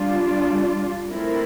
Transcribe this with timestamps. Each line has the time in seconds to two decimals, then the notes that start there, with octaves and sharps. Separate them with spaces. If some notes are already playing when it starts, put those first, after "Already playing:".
Already playing: G3 D4 F4
1.11 A3 C4 E4 A#4